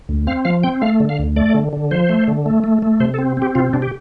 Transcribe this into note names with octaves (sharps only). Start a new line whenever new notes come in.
D2
C4 F5
F3 F5
C4 G5
A3 F5
D3
F5
D2
A3 D5
D3
D3
F3 C5
A3
D3
A3
A3
A3
C3 C5
A4
C4
C4 G4
C3 F4
C3 D4
G4